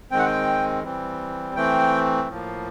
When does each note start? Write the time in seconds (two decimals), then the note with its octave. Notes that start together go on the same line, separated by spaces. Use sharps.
0.11 D#3 G#3 C4 G5
0.19 F#5
0.26 G5
0.83 E3 G3 C4
1.55 E3 A3 C4 G5
2.28 A2 F3 A#3